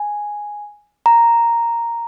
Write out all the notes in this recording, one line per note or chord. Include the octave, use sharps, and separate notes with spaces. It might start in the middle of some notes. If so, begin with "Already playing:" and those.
Already playing: G#5
A#5